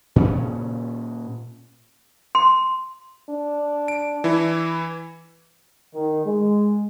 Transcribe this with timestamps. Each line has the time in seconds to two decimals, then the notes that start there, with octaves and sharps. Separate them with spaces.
0.16 A#2 C#3 C#4
2.35 C6
3.29 D4
3.88 D7
4.24 E3 E4
5.95 D#3
6.25 G#3